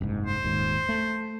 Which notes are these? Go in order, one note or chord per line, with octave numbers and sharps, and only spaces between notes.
F#1 C2 G#2
C5
D#1 D#2 G#2
A3